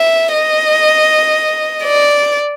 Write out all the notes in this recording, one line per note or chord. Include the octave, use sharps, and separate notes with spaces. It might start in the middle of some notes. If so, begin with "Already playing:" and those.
Already playing: E5
D#5
D5